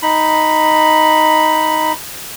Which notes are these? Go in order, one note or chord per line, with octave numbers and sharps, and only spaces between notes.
D#4 B5